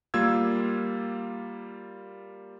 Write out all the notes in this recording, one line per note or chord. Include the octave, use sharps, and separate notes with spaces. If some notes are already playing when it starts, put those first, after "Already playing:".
G3 A#3 F4 E6 G#6